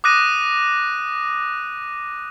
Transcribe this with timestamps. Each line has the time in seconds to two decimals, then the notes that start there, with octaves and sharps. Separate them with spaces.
0.04 D6 D#6 F#6 A#6 D#7